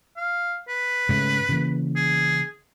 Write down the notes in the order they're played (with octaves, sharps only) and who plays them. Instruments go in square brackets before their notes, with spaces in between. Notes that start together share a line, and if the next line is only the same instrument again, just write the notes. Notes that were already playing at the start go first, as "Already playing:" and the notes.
[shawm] F5
B4
[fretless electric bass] G#2 C#3 A3
C#3 E3 A#3
[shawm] G#4